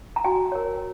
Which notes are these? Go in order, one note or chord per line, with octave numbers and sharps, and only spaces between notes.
A#5
F#4 G#5
A#4 C#5